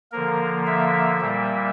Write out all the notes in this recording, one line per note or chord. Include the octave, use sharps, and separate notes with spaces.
D3 F3 A#3 A#4
E5
A#2 G3 A#3